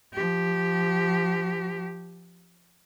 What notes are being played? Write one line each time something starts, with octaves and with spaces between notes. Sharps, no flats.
F3 G4